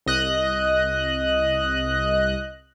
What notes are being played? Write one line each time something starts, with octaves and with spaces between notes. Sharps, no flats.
C2 D#5 F#6